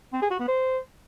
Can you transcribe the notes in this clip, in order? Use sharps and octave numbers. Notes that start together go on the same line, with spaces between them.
C4
G#4
F#4
B3
C5